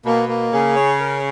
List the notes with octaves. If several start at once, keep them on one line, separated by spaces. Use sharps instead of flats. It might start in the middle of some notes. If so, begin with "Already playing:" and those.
B2 A#3
A#3
C#3 G#4
C#5
A#4